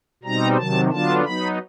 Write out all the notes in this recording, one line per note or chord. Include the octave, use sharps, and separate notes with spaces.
B2 G3 C4 D#4 A#5
C3 D#3 F#3 A5
D3 F#3 B3 D4 F4 A5
F#3 B3 D#4 B5